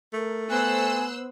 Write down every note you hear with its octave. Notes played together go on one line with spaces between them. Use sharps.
A3 A#4
B3 C5 G#5 E6 F#6